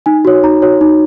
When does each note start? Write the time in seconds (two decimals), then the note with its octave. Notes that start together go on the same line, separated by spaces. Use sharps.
0.06 D#4 G#5
0.25 F#4 C#5
0.43 D#4 A#5
0.62 F#4 C#5
0.81 D#4